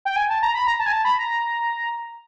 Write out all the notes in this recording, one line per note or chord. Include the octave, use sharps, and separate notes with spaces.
G5
G#5
A5
A#5
B5
A#5
A5
G#5
A5
B5
A#5